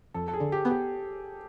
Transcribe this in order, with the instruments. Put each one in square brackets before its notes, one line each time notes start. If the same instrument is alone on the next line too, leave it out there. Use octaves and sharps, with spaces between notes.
[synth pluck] F2 [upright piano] A4
[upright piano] A4
G#4
[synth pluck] D3
[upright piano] G4
[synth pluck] B3
[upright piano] G4